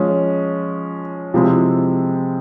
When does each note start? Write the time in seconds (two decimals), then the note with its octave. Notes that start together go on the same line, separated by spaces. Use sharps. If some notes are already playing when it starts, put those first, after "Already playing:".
Already playing: F3 G#3 C#4
1.34 C3 F3 G#3 C4 E4